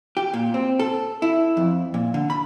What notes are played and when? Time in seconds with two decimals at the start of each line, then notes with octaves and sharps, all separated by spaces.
0.17 G4
0.34 A#2
0.54 C4
0.79 A4
1.22 E4
1.57 F2
1.94 A#2
2.14 D3
2.30 B5